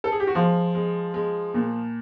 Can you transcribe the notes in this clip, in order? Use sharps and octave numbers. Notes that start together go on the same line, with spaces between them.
A4
G#4
G4
F#4
F3 G#3 F4
G#3
G#3
A#2